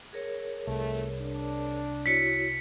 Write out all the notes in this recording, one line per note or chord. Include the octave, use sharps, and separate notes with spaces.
G#4 A#4 C#5
C2 F2 A3
D4
E4 F#4 C#5 B6 C#7